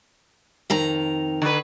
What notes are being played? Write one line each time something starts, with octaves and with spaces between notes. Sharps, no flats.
F2 D#3 A#5
D3 B4